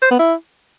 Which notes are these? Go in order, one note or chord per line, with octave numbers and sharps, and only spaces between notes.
C5
B3
E4